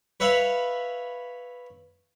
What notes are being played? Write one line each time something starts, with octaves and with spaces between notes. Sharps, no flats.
B4 C#5 E5 F5 B5